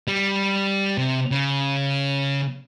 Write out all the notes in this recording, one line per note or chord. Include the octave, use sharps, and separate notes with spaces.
G3
C3
C#3